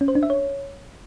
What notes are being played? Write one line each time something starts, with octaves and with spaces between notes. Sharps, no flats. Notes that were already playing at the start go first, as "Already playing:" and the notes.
C#4
C5
D4
E5
C#5